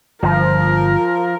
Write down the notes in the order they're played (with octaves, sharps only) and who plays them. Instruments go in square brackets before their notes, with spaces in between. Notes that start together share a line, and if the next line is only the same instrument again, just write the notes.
[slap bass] G1 [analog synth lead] F3 [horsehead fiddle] A#4